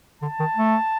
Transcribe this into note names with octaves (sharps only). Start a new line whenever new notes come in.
D3 A5
D#3
A3